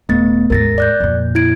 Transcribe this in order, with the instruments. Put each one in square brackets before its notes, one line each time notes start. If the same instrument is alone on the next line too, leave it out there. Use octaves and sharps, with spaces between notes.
[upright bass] D#1 [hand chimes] A3 B3 A6
[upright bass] D#2 G#2 [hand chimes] A#4 A6 A#6
[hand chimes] D5 F#6 G6
[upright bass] F2 A#2
[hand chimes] E4 G#6 D7